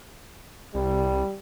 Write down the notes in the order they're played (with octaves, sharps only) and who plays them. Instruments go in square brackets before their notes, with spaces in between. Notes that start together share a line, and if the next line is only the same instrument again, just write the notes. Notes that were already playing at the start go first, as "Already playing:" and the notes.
[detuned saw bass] C2 [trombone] G3